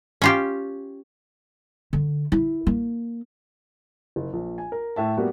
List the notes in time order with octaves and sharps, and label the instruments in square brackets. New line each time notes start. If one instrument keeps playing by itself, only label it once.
[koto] C#4 F4 G4
[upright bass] D3
E4
A#3
[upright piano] F#1
A#1
G#5
A#4
A2 E5 A5
G3 A#3 B3 F#4